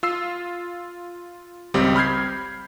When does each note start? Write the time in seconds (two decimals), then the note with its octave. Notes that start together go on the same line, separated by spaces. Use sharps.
0.03 F4 E6 C7
1.74 G#1 C#2 G3 C4 G4
1.96 B5 F6 G6 G#6 C7